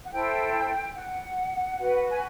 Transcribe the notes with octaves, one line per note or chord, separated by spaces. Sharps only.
F#5
E4 A4 C5 G5
F#5
F#4 B4
G#5